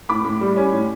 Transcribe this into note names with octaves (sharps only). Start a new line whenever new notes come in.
A2 B5 D6
A2
G3
C#4
A2